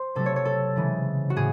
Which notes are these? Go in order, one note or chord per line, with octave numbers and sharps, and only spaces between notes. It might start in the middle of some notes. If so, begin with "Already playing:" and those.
Already playing: C5
C3 F#3 A3 A4
C#5
C#5
A4
C#3 E3 G#3
F#4
A2 G#4